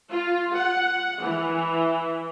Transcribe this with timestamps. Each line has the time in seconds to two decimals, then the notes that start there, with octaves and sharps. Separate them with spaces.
0.11 F4
0.56 F#5
1.22 E3